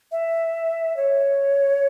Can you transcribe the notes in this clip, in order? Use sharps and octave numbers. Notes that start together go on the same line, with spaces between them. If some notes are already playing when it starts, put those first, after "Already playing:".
E5
C#5